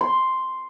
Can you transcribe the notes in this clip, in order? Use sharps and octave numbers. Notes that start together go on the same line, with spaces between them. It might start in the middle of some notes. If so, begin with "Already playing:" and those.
C6